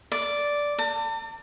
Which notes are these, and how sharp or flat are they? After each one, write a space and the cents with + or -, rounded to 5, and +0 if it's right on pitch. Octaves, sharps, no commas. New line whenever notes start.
D5 -5
A5 +40